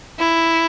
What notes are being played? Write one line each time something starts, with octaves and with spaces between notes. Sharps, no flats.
E4